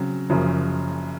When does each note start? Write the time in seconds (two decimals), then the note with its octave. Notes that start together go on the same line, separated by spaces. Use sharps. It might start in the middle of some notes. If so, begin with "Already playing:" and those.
Already playing: C#3 F#3 C4
0.30 F#1 F#2 C#3 F3